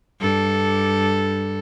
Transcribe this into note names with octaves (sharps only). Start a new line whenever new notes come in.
G2 A4